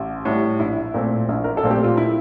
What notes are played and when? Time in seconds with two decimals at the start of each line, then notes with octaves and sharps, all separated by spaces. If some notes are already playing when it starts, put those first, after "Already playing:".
Already playing: A1
0.25 A2 G3
0.60 A#1 E4
0.94 A#2 A3 C4
1.29 A#1
1.44 A#4
1.57 A4
1.63 A#2 A3 C4
1.71 G4
1.84 F4
1.97 E4